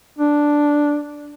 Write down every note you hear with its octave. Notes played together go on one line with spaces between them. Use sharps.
D4